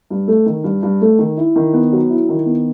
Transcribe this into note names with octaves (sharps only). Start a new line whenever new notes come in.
G2
A3
D#3
G2
G2
A3
D#3
E4
D#3
B3
F#3
E4
D#3
B3